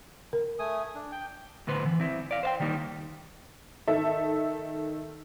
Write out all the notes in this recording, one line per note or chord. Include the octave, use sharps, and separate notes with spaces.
A#4
A3 G#5 D#6
D4
G5
A2 D3 B3 B4 C5
E3
C4 E4
D5 F5
C5 F5 G5
D#3 G3 A#3 D#4
D#3 A4 E5